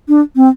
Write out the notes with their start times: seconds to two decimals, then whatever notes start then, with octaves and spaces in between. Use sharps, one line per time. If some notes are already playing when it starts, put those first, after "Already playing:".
0.08 D4
0.36 C4